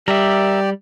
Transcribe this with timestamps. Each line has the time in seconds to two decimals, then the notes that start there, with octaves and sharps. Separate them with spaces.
0.08 G3 G4 A#4 D5 E5